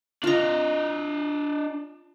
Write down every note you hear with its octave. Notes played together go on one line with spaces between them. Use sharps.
D4 F4 D#5 A#5